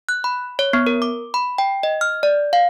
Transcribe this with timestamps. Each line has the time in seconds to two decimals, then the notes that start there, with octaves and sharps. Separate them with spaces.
0.09 F#6
0.24 B5
0.59 C#5
0.73 B3
0.86 A#4
1.02 D6
1.34 B5
1.58 G5
1.83 D#5
2.01 F6
2.23 D5
2.53 F5